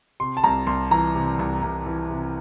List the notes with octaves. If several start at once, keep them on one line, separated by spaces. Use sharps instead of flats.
C3 C6
A5
C2 A#5
C2 C6
E3 A#5
C3
C2
C2
E3
C3